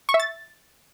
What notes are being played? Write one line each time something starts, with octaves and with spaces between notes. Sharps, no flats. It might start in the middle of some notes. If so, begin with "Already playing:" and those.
C#6
E5
A6